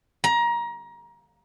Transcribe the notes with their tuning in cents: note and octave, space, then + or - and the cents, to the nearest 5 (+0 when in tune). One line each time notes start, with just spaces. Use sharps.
A#5 +25